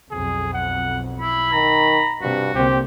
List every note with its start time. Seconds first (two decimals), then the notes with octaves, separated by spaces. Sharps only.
0.11 B1 F2 G#4
0.53 F#5
1.20 E4 B5
1.53 D#3 A#5
2.22 G2 C3 F#4
2.55 C2 D3 A#3 C4 G4